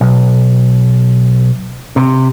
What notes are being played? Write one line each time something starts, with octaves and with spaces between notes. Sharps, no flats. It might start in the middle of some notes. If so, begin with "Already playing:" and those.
B1
C3